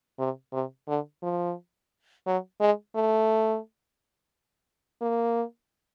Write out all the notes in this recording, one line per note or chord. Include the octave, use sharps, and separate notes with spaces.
C3
C3
D3
F3
F#3
G#3
A3
A#3